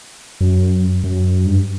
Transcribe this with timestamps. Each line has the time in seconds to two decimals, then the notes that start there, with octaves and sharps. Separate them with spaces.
0.41 F#2
1.04 F#2
1.46 G2